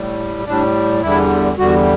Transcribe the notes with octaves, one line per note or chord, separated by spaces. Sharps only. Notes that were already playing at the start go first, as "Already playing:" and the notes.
Already playing: A2 G3
A2 G3 D4
E2 D3 G3 E4
E2 D3 G3 F#4